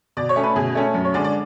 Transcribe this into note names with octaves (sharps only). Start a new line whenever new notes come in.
B2 D5
C#5
A3 C#4
B4
B2 G#4
A3 C#4
F#2
C#5
D3 G#3 D5
D5